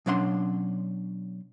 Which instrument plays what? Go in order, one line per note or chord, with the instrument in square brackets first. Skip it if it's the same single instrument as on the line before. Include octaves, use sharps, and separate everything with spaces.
[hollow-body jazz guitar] B2 F#3 C#4 D4 F#5 C6